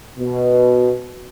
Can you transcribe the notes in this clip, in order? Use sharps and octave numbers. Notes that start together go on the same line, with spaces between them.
B2